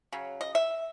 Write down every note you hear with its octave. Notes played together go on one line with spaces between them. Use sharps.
C#3 F#3
D#5
E5